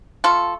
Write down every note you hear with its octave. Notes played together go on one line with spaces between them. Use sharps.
A3 F4 A4